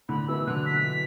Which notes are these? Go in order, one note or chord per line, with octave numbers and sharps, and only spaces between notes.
A2 D3 B5
B2 E3 E6
D3 F#3 F#6
B6